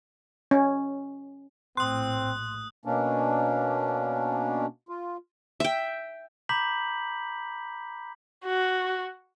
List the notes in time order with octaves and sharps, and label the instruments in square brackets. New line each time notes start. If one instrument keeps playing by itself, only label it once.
[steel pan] C#4
[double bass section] A#1 A2 [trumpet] C4 [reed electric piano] C6 [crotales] D#6 F#6
[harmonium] B2 A#3 C#4 D4
F4
[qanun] E5 G5
[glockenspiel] A#5 B5 D6 G6 B6 F#7
[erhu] F#4